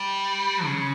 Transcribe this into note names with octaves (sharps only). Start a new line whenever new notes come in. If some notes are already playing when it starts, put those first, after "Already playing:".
Already playing: G3
C#3